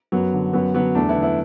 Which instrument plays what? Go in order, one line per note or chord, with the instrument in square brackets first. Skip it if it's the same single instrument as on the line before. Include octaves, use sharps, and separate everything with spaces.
[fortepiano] F#2 F#3 B3
D3
F#2 F#3 B3
D3 F#3 B3
E2 A3 D4
B3 E4
D3
B3 E4